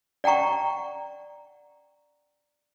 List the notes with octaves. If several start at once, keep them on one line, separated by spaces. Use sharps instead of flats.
D5 F#5 G5 A#5 C#6